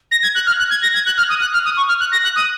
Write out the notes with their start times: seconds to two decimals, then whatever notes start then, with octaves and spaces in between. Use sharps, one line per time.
0.11 A#6
0.23 G#6
0.35 F#6
0.47 F6
0.59 F#6
0.70 G#6
0.83 A#6
0.94 G#6
1.06 F#6
1.17 F6
1.29 D#6
1.41 F#6
1.53 F6
1.65 D#6
1.77 C#6
1.88 F6
2.00 F#6
2.12 A#6
2.24 F#6
2.36 D#6